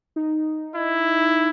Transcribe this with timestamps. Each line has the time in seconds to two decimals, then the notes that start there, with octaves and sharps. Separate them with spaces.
0.16 D#4
0.75 E4